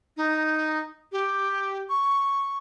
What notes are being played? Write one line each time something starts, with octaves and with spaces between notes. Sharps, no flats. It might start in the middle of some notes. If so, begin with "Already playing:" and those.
D#4
G4
C#6